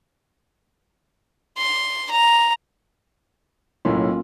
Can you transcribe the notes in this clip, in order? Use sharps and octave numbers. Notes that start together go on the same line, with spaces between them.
C6
A#5
B1 A2 A#3 C#4 F4